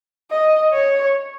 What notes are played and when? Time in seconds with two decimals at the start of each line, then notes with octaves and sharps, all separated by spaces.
0.31 D#5
0.73 C#5